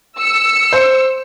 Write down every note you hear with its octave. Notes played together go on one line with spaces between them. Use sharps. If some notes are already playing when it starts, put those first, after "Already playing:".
E6 C#7
C5